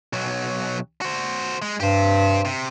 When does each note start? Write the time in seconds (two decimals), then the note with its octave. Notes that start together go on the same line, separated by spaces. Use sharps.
0.13 B1 F#3
1.01 F#4 C5
1.62 G#3
1.80 G2 G4 C5
2.45 C3